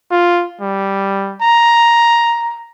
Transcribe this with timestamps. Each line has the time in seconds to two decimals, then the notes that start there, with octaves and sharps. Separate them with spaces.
0.11 F4
0.61 G3
1.41 A#5